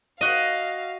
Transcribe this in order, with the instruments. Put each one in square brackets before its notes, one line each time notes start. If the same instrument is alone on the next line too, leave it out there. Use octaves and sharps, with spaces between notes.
[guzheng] F#4 D#5 [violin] F5